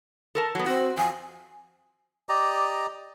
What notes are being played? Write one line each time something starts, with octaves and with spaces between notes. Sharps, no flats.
A4 A#4 A5
F#3 B3
C4 F#4
F2 G#5
G4 D5 D#5 A#5